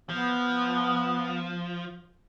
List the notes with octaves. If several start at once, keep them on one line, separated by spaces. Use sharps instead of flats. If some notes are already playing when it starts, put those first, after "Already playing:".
F3 B3